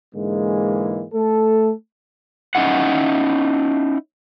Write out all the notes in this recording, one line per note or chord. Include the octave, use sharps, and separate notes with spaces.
G#2 D3 E3 G#3 A#3
A3 A4
C#4 D#4 E4 F#5